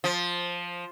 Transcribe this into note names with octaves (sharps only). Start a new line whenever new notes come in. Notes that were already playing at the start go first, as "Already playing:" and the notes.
F3